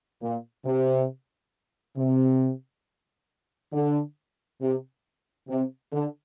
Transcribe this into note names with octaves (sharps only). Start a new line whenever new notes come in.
A#2
C3
C3
D3
C3
C3
D3